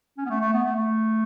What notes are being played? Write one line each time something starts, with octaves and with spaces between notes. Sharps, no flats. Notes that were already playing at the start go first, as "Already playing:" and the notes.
C#4
B3
A3
A3
B3
A3
A3